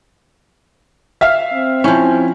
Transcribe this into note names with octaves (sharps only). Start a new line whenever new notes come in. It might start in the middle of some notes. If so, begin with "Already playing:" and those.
E5 F5 F6
C4
F3 C#4 E4